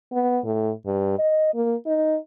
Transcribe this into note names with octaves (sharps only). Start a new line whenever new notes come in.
B3
A2
G2
D#5
A#3
D#4